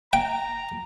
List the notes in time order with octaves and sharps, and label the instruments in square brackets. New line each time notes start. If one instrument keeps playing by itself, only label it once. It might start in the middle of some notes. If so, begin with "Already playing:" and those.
[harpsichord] G5 [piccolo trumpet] A#5